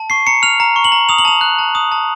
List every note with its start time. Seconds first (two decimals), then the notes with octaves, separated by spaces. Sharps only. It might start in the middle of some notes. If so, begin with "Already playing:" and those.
Already playing: A5
0.10 C#6 C7
0.27 A#5 C#7
0.43 F6 F7
0.60 A#5
0.76 C#6
0.84 F#7
0.92 A#5
1.09 D#6 F7
1.18 F#7
1.25 A5 F7
1.41 F#6
1.59 A5
1.75 D#6
1.92 A5